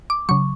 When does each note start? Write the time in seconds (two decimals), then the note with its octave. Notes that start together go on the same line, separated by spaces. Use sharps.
0.10 D6
0.29 C#3 F#3 C#6